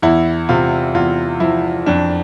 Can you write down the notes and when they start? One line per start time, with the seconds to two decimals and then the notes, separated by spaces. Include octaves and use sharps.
0.02 E2 E4
0.49 C3 F4
0.94 E2 F4
1.40 F3 E4
1.86 F2 D4